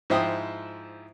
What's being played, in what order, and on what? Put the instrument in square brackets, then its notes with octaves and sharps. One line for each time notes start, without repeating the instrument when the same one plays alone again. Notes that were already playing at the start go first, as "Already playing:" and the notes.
[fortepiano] G#2 F3 E4 G5 D#6